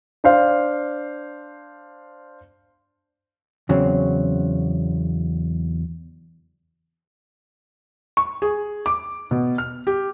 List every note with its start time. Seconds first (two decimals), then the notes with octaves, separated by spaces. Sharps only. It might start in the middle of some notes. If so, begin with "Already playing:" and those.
0.24 D4 C5 F5
3.69 E2 C#3 F#3 C4
8.17 C#6
8.42 G#4
8.86 D6
9.31 B2
9.58 F6
9.87 G4